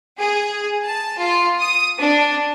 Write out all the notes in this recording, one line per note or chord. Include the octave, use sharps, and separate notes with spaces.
G#4
A5
F4
D#6
D4